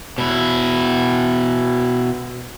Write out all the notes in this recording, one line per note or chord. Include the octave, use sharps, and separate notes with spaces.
B2 E4